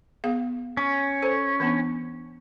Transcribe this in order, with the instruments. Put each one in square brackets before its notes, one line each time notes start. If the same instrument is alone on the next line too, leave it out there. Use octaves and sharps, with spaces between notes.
[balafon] B3 G#4 F5
[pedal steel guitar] C#4
[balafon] A4 C5
E3 B3 D4